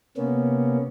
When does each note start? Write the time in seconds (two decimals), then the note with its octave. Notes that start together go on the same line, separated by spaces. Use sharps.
0.17 C3 A#3 B3 C#4